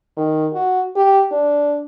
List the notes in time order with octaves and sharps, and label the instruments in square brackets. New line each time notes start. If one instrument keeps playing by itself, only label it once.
[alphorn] D#3
F#4
G4
D4